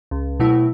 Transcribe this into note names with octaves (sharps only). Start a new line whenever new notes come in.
C#2
B2 F#3 A3 E4